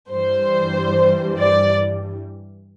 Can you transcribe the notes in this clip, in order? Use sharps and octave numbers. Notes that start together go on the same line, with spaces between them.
G2 E3 G3 C5
D5